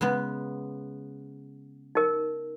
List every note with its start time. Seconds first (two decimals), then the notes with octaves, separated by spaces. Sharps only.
0.01 C#3 G#3 B3
1.95 D#4 A#4